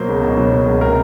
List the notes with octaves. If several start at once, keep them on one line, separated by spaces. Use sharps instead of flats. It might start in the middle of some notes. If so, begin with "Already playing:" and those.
Already playing: B2 F#3 A#3 C5
C#2
B2
F#3
A#3
C#2
C3 A#4